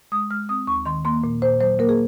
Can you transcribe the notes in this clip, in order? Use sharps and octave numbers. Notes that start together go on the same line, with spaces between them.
G#3 D#6
G#3 F6
C4 D#6
D#2 C#6
D#3 C6
A#3 C6
A#2
A#2 C5
F#3 C5
A#3 A#4
G#4